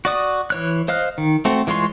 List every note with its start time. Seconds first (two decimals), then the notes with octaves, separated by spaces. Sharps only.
0.05 F#4 D5 D#6
0.50 E3 C#5 F#6
0.88 C5 D#5 F5 F6 F#6
1.18 D#3
1.45 A3 C4 F#4
1.67 E3 G#3 F4 C#5 C6